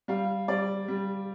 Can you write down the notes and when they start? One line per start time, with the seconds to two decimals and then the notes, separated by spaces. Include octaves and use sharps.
0.08 G3 F5
0.48 G3 D5
0.88 G3